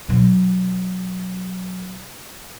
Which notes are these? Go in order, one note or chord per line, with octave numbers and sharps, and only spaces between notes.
B2 F#3